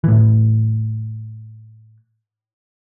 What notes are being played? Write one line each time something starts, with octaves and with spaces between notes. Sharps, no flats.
A2 E3